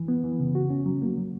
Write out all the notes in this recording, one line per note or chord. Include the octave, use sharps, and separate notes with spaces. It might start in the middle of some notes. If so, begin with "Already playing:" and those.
Already playing: E3
B3
E3
C#3
F#4
C#4
F#3
A#3
F#3